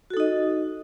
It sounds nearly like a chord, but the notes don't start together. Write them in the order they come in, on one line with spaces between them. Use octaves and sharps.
F#4 A4 D#4 D#5